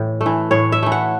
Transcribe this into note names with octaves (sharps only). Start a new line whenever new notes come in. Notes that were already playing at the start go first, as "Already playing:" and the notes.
Already playing: A2 E3
A3
E3
A2 C#5
E5
E3 A3
F#5